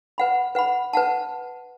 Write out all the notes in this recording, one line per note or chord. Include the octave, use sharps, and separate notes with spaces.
B4 F#5 B5
B4 F#5 B5
B4 F#5 A5